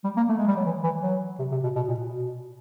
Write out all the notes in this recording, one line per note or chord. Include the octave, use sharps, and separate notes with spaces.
G3
A#3
A3
G#3
G3
F#3
E3
E3
F#3
C3
C3
B2
B2
A#2
B2